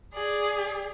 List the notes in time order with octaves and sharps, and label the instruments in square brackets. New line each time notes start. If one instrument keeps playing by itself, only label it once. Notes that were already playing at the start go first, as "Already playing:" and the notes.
[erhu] G#4 [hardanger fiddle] D5